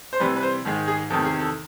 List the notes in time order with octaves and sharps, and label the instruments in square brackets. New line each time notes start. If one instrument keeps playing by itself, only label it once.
[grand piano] C5
C3 E3 G3 B4
B4
C5
G#2 D#3 G#3
G#4
E2 C3 D#3 A4
G#4
A4